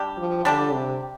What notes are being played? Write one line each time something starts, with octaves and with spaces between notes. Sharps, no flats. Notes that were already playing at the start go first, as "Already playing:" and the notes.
Already playing: G3 D4 G4
F3
D3 G3 D4 G4
C3